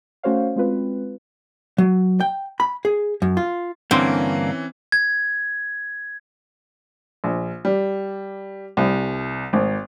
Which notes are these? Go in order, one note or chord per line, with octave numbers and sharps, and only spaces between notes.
A3 C#4 F#4 C5 C#5 F5
G#3 C4 F4 B4
F#3
G5
B5
G#4
F#2
F4
G2 D3 E3 A#3 C4 C#4
G#6
A#1
G3
C2
G#1